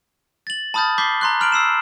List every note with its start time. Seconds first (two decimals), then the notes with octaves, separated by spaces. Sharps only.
0.47 A6 F#7
0.74 A5 B5 D#6 F6 G6 A6
0.98 D6 G6 B6 C7 G7
1.21 A#5 C6 F#6
1.40 B5 F6 D7 F#7
1.52 E6 C7 E7